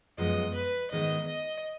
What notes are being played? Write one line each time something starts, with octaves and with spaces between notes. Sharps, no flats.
F#2 F3 G#3 B3 D#5
B4
G#2 D#3 G#3 B3 D#5
D#5